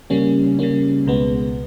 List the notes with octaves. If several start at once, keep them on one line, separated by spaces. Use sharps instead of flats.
C#3 G3 A#3 C#4
C#3 G3 A#3 C#4
C#2 B2 G#3 B3